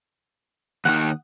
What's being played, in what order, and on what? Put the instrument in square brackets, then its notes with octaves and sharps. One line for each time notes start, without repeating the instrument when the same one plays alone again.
[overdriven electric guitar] D#2 D#3 [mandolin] F#5 D#6